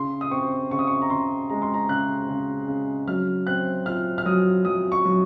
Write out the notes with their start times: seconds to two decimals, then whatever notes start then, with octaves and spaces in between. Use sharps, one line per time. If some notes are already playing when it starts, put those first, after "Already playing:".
Already playing: C#3 C6
0.21 D#6
0.31 C4 C#6
0.71 C#3 C#6
0.79 D#6
0.87 C#6
1.02 A#5
1.10 C#3 C6
1.50 G#3 A#5
1.62 C6
1.74 A#5
1.89 C#3 F#6
2.29 C#3
2.68 C#3
3.07 F#3 F6
3.47 C4 F#6
3.86 F4 F6
4.18 F6
4.25 F#3 D#6
4.65 F#3 D#6
4.92 C#6
5.05 F#3